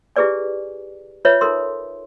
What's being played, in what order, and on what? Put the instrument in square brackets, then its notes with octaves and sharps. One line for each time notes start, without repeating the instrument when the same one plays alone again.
[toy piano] E4 G4 G#4 B4 D5 G#5
F4 B4 C#5 E5
D#4 F4 A4 A#4 C6